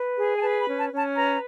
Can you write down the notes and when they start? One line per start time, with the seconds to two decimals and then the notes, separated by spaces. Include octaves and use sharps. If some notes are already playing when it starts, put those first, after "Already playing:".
Already playing: B4
0.16 G#4
0.35 G#5
0.41 B4 A5
0.60 B5
0.66 C#4
0.79 A5
0.92 C#4
0.97 A5
1.16 B4 A#5